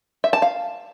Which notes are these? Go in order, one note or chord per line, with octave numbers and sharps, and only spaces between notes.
E5
A5
F5